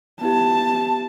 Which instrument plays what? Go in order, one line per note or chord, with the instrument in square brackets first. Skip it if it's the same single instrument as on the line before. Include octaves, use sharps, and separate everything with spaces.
[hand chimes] B3 E4 G4 [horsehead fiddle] A5